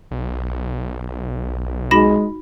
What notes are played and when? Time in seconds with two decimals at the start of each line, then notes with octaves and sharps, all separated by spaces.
0.11 B1
1.91 G#3 D#4 F#4 B5 A#6 E7